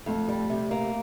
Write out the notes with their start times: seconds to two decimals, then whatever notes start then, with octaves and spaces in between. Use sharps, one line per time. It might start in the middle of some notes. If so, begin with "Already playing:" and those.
0.06 F2 A3
0.28 G3
0.50 C3
0.71 A#3